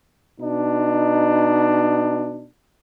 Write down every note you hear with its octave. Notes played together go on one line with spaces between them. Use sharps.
B2 D4 D#4